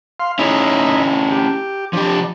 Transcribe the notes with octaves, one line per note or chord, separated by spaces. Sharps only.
F5 C6
C#4 D#4 E4 G#4 E5 B5
G4
F3 D4 G4